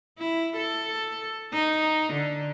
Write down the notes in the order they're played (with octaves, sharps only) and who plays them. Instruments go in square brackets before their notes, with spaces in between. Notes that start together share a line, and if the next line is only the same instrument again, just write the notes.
[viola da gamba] E4
A4
D#4
D3